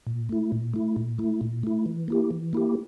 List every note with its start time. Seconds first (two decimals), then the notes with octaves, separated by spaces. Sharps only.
0.07 A#2
0.29 A3 E4
0.52 A#2
0.74 A3 E4
0.96 A#2
1.18 A3 E4
1.41 A#2
1.63 A3 E4
1.86 E3
2.08 A#3 E4 G4
2.31 E3
2.53 A#3 E4 G4